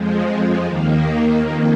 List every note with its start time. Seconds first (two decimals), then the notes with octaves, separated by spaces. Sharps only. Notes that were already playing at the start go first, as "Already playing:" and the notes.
Already playing: F2 F3 G#3
0.66 D#2 D#3 A#3
1.43 F2 D#3 A#3